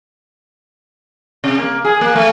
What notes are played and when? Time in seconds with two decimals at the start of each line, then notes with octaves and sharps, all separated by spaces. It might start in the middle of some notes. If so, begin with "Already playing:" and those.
1.44 C3
1.58 A#3
1.84 G#4
2.01 A#3
2.16 A3